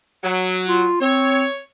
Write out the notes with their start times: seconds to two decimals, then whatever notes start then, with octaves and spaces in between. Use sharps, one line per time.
0.23 F#3
0.68 F4
1.01 C4 C#5